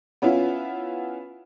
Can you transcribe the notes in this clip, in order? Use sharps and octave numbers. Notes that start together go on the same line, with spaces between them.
B3 C#4 E4 F4